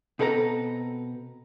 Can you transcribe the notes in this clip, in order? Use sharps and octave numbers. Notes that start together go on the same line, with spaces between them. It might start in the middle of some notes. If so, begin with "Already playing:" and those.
B2 C4 A4 B4 D5 A#5